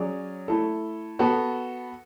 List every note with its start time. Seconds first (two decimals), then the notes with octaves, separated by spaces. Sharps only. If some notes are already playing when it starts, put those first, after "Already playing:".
Already playing: F#3 C#4 G#4 D5
0.48 A3 E4 A4
1.19 B3 F#4 A4